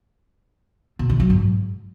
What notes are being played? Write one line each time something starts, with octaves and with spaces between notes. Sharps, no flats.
B2
D#3
F#3
G#2